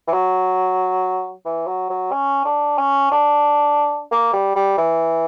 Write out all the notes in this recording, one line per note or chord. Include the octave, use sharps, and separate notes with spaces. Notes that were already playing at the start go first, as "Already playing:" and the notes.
E3
F#3
E3
F#3
F#3
C#4
D4
C#4
D4
A#3
G3
G3
E3